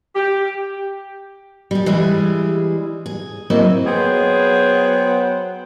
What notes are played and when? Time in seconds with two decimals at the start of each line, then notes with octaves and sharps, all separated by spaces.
0.16 G4
1.71 G3 G#4
1.86 E3 G3 G#3 E4 G#4
3.06 G#4
3.50 F#3 A#3 C4 E4 D#5
3.86 F#3 B3 G#4 C5 G5